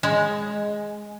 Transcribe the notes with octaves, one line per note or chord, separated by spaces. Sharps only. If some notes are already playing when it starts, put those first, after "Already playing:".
G#3